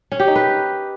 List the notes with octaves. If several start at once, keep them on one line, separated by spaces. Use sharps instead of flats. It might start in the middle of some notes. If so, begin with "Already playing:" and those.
C#4
G4
D#4
B4